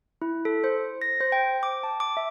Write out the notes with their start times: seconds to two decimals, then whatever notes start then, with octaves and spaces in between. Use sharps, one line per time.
0.22 E4
0.45 A4
0.64 C5
1.02 A#6
1.21 C5
1.32 G5
1.63 D6
1.83 A5
2.00 D6
2.17 E5